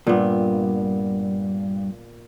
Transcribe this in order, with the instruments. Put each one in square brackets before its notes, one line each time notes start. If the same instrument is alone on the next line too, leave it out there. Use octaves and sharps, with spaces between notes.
[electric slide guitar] E2 G2 [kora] A#2 B3